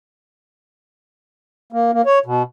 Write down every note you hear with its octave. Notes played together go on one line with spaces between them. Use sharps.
A#3
A#3
C#5
B2